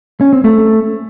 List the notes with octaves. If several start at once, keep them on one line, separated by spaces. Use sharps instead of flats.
C#4
C4
A3